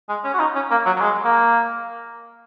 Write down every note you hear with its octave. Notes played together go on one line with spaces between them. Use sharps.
G#3
C#4
F#4
D#4
C#4
A#3
F#3
F#3
G#3
A#3